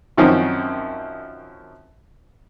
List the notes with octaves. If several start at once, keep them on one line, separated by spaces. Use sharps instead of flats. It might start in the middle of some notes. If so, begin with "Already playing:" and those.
F#2 D#3 F3 C4 C#4 D#4